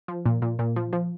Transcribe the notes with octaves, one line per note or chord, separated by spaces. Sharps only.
F3
A#2
A#2
A#2
F3
F3